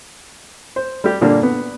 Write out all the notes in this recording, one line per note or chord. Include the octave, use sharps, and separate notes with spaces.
C5
G3 G4
A#2 D3 G3 A#3 D4
B3